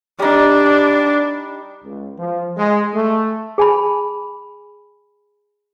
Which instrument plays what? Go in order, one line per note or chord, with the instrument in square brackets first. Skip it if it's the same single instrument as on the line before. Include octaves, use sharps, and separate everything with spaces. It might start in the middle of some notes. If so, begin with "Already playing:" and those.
[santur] G3 D#4 [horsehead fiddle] D4
[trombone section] C#2
F3
G#3
A3
[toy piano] G#4 G#5 A5 B5